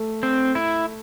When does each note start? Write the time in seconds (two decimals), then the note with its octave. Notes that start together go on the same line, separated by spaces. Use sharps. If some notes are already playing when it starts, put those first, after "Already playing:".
Already playing: A3
0.23 C4
0.55 E4